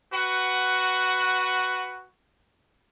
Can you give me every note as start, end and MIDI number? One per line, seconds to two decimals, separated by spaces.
0.14 2.06 66
0.14 2.06 71
0.14 2.06 78